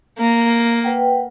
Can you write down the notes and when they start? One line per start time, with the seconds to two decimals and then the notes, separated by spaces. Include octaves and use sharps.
0.18 A#3
0.84 B4 F#5 G5